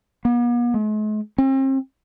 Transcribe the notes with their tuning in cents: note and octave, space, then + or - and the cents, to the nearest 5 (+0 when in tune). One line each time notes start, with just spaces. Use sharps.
B3 -45
G#3 +45
C4 +40